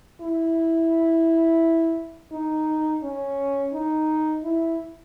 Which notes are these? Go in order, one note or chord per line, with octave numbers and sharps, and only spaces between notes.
E4
D#4
C#4
D#4
E4